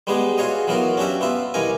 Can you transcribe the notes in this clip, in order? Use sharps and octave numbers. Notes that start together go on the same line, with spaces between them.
G3 G#3 B3 D#4 G#4
F4 F#4 G#4 C#5 D#5
E3 F#3 B3 F4 A#4
C#4 D4 F#4 G4 E5
B3 F4 E5
C2 E3 D#4 A#4 G#5